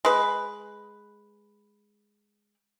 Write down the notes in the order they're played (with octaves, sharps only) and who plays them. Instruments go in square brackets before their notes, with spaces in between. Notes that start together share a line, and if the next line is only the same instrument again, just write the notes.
[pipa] G#3 B4